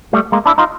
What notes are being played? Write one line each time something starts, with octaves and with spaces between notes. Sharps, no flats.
G3 A3
G#3 A#3
D4 E4
D#4 F4